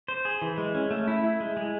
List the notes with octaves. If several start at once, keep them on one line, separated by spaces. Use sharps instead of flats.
C5
G#4
E3
G#3
C#4
A3
E4
E4
G#3
G#3